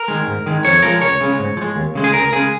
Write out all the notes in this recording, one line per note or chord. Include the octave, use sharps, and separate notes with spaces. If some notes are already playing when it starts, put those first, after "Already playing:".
Already playing: A#4
D#3 G#3
G#2
D#3 G#3
F2 C#5
F3 G#3 A#4
C#2 C#5
C#3 G#3
G#2
F3
G#3
D#2
C#3 G#3
G#4
C#2 A#4
C#3 G#3 G#4